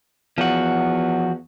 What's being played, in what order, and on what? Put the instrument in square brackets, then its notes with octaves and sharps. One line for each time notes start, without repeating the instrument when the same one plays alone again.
[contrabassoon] E2 [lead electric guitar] F3 F#4